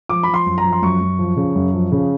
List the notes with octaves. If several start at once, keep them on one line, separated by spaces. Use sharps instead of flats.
F3 D6
F3 B5
C6
F#2
A#5
F3
C6
F#2 C#6
F#2
F3
C#3
F#2
F3
C#3